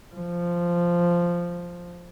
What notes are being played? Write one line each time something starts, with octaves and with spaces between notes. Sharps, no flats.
F3